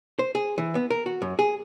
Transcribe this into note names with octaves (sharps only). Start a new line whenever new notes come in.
C5
G#4
E3
B3
A#4
F#4
F#2
G#4